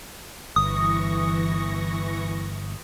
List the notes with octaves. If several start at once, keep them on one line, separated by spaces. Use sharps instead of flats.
G1 E3 C#6 D#6 A#6